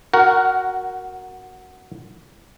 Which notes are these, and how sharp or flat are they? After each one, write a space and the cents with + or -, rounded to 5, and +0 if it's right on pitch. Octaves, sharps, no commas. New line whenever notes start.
F#4 +0 A#4 +0 F#5 +25